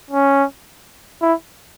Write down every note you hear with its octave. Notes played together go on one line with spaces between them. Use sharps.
C#4
E4